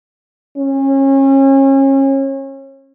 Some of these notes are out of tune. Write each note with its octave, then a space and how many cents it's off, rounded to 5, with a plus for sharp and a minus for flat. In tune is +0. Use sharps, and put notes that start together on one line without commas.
C#4 -30